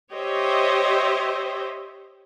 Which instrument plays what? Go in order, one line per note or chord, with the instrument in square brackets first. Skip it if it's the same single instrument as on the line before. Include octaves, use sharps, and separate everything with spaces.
[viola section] G4 C5 C#5 D#5 E5